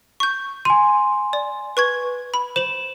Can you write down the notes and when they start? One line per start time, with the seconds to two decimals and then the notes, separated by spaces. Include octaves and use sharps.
0.20 C#6 G6
0.65 G#5 C6 D#7
1.33 D5
1.77 B4 C#6 G#6
2.34 B5
2.56 C5 E7 F#7